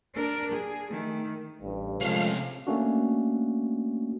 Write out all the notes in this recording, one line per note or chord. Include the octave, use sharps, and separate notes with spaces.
D4 A#4
G#4
D#3 A3
A1 G2
C3 F3 G#3 A3 C#4 A4 F5
A3 A#3 C#4 D4 F#4